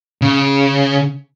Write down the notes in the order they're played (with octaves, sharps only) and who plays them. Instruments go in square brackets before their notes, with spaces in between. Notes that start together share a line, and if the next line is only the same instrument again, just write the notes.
[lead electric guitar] C#3